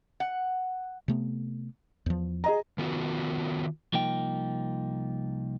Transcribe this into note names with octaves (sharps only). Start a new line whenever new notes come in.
F#5
C3 A3 B3
E2 F3
G#4 D#5 A#5
D#3 B3 F4 F#4
C2 F3 A#3 D#4 G5